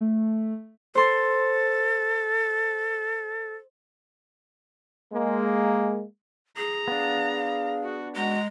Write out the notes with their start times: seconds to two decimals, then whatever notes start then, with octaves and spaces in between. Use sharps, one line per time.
0.01 A3
0.95 A4 C5 C6
5.13 G#3 A#3
6.57 G#4 A#5
6.88 B3 D4 F5
7.36 F5
7.83 F#4
8.16 G#3 F#4 A#5